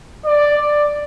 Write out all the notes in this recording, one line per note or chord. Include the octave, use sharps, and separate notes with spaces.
D5